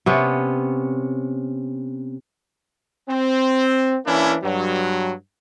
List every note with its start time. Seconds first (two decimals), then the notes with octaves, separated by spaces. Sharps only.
0.06 C3 B3 C#4
3.09 C4
4.06 E3 A#3 C#4 D4 E4
4.43 G2 F#3